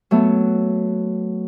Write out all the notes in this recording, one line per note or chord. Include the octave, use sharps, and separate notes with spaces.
F#3 A3 B3